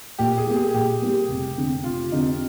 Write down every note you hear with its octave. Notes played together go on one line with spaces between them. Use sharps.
A#2 G4
G#4
G3 A#3
G#4
A#2 G4
G3 A#3
F1
F2 D3
F1 F4
F2 D3 D#4